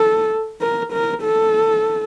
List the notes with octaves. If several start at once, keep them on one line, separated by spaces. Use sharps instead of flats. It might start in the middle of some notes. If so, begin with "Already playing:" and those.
Already playing: A4
A#4
A#4
A4